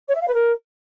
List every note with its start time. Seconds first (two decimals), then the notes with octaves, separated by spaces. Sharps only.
0.08 C#5
0.14 E5
0.21 F5
0.27 B4
0.34 A#4